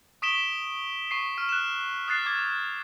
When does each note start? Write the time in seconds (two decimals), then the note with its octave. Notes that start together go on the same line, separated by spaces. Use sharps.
0.22 C#6 D#6 B6 D7 E7 G7
1.11 C#6 C7
1.37 C#6 F6
1.49 F#6 E7
2.08 D#6 F#6 A6 C7
2.26 D6 G#6 A6